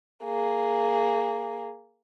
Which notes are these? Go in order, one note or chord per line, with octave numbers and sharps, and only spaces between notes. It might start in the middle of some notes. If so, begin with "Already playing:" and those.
A#3 G#4